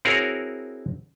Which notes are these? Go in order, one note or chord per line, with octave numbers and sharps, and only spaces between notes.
C4 E4 F#4 G#4 A#4 C#5